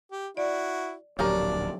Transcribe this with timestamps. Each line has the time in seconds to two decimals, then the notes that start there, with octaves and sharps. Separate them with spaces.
0.12 G4
0.37 E4 F#4 D5
1.19 D1 A#1 F#3 C#4 D4 G4 A#4 D5